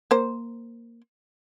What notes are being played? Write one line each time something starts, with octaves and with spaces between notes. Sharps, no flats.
A#3 C5